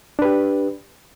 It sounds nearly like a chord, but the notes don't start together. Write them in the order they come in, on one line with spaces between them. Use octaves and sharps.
D4 B4 G4